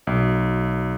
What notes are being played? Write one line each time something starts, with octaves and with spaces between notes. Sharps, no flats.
B1